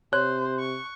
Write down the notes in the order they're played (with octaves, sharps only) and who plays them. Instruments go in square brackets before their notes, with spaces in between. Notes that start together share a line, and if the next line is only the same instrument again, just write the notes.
[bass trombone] C3 [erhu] C5 [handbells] C#5 [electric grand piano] F#6
[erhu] C#6